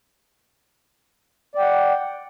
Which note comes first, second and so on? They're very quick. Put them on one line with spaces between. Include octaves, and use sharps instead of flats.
D5 G5 F#5